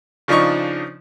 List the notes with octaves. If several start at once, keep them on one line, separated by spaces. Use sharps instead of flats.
C#3 F3 D4 D#4 C#6